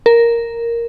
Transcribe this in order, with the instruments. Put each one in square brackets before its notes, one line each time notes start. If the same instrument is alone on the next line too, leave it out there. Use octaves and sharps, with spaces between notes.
[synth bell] A#4